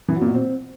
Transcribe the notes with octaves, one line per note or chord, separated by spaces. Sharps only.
E3
F#3
A#2
B2
C4